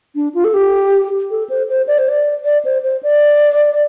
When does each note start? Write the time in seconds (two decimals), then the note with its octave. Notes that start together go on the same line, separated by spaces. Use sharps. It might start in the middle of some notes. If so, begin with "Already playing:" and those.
0.15 D4
0.34 F4
0.44 A4
0.54 G4
1.31 A4
1.50 C5
1.69 C5
1.87 D5
1.98 C5
2.09 D5
2.45 D5
2.65 C5
2.84 C5
3.03 D5